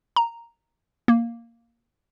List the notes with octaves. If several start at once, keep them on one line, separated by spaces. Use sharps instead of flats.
A#5
A#3